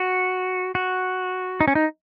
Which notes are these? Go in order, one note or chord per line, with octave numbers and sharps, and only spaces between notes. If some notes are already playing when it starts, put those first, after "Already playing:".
Already playing: F#4
F#4
D#4
C#4
D#4